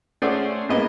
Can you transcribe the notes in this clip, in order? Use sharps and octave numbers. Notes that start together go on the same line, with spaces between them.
A3 C#4 G#4 C5 D5 F#5
A2 G#3 A#3 B3 D#5